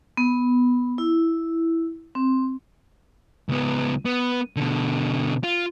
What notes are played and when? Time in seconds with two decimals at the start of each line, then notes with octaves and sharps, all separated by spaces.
0.17 B3
0.98 E4
2.15 C4
3.49 C#2 B3
4.05 B3
4.56 B2 D3
5.44 F4